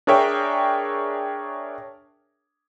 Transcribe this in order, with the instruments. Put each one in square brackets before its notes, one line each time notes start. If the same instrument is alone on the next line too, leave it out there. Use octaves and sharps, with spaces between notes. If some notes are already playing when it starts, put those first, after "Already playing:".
[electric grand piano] D4 G#4 A#4 C#5 E5 G5